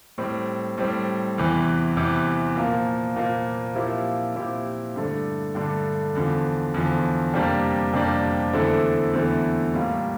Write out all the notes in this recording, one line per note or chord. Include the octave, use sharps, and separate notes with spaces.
A2 G3 C4
A2 G3 C4
E2 C3 E3
E2 C3 E3
A#2 F3 A#3
A#2 F3 A#3
A#2 F3 C4 E4 G4
A#2 F3 C4 E4 G4
G2 D3 A3 D4
G2 D3 A3 D4
E2 D3 F3
E2 D3 F3
F2 C3 G3 A#3 D4
F2 C3 G3 A#3 D4
E2 D3 A3 C4 E4
E2 D3 A3 C4 E4
A2 G3 A#3 F4